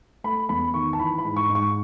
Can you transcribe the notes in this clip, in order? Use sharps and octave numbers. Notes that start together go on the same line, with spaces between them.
A3 B5
E2 B5
D#3 C#6
A5
E3 B5
B5
G#2
C#6
G#2
C#6